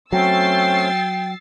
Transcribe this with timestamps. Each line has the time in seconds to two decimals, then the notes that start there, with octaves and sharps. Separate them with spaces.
0.12 F#3 A3 C4 C#4 G5 E6 A6 C7